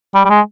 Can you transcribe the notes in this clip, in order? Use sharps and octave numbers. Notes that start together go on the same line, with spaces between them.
G3
G3
G#3